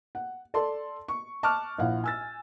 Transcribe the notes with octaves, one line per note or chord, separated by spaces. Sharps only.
F#5
A4 D5 A5 C6
C#6
A5 C#6 D6 F6 F#6
A#1 E4 F5 F#5
G#5 E6 A6